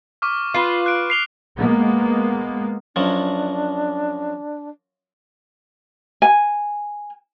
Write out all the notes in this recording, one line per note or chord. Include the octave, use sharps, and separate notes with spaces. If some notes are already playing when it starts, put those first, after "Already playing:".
C#6 D6 F6
F4 B4
F#6 D7
C7 F7 G7
G#3 A#3 B3
F#2 F3 F#3 D4
G#5